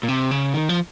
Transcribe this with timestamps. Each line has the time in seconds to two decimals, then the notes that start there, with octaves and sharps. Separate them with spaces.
0.03 A#2
0.08 C3
0.31 C#3
0.54 D#3
0.69 F3